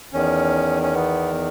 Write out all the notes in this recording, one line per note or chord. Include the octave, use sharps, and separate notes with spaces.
E2 D#3 C#4
C#4
B3